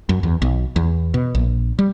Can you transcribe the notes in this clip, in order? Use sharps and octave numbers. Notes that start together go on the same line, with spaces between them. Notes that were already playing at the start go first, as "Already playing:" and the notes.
F#2
E2
B1
E2
B2
A#1
G3